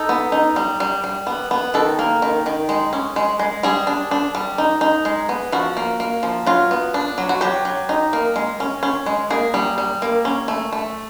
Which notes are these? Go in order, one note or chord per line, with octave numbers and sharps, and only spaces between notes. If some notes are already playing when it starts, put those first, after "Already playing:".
Already playing: D#4 A4
B3
D#4
G3
G3
G3
B3
B3
D#3 A4
A#3
D#3
D#3
G#3
C#4
G#3
G#3
G3 G#4
D4
D4
G3
D#4
D#4
G#3
B3
F3 F#4
A#3
A#3
F3
F#3 F4
B3
D4
F#3
F#4
F#3 G4
F#3
D#4
A#3
G#3
C#4
C#4
G#3
A#3 G#4
G3
G3
A#3
C#4
A3
A3